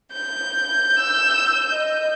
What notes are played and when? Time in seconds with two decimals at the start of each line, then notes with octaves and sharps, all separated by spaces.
0.12 G6
0.98 E6
1.71 D#5